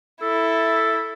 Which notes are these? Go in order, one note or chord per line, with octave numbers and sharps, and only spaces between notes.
E4 A4